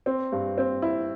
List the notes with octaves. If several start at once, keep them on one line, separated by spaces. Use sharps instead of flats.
C4
G2
C4
E4